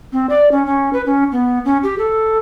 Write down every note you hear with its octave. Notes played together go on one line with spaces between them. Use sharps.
C4
D5
C#4
C#4
B4
C#4
B3
C#4
G4
A4